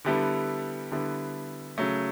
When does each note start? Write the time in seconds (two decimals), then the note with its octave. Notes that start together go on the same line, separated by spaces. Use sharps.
0.05 D3 G3 B3 E4 A4
0.92 D3 G3 B3 E4 A4
1.78 C#3 F#3 A3